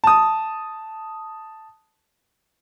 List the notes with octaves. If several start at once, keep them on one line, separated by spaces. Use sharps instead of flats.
A5 D#6